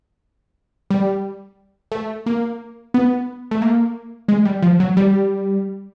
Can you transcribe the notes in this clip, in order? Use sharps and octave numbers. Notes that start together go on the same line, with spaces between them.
G3
A3
A#3
B3
A3
A#3
G#3
G3
F3
F#3
G3